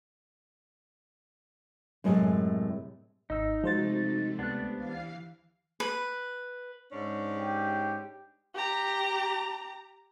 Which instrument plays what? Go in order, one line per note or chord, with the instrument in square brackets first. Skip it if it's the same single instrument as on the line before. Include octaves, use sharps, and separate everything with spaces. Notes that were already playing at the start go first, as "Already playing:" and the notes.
[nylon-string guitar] F#2 A2 C3 G#3
[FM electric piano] G#1 [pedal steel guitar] D#4 [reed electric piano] D#5 E6
[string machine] C3 A3 [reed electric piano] F3 F#4 [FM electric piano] G#3 C5 A6
[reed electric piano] C#2 G4 F#6 [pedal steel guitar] B3 D4
[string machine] E3 F5 C7
[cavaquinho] B4
[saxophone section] G#2 C#4 D4
[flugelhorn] G4
[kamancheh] G4 A#5